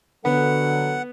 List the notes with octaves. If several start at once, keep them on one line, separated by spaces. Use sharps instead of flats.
D3 F#3 B3 A4 F#5